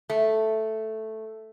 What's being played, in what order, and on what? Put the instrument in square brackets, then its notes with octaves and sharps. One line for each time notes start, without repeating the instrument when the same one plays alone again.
[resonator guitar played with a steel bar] A3